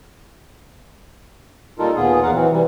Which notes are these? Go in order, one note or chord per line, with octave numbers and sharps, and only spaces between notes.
A#2 G3 D#4 F4 A4 A#4
D#2 A#2 B3 F4 G#4
E2 A#4 F5 F#5
E3 F#3 C4
C3 E3 G3